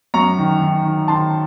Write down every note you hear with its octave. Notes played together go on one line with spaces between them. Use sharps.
F#2 A#5 C#6
D#3
D#3
D#3
D#3 A5 C6